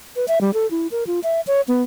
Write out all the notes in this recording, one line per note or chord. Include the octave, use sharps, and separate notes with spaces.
B4
E5
G3
A4
E4
A#4
F4
E5
C#5
B3